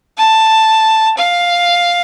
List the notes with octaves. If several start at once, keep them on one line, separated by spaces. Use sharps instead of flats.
A5
F5